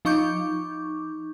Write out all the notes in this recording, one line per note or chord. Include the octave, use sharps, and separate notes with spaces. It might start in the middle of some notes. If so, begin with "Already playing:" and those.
F3 D#4 C#6 D6 G6